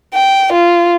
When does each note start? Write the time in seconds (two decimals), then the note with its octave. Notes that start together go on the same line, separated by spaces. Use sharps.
0.14 G5
0.53 F4